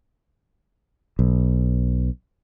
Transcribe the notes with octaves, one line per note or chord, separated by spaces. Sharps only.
B1